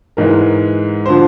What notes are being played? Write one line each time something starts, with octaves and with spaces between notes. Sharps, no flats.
G#2 E3 G#3 A#4
D3 F3 C5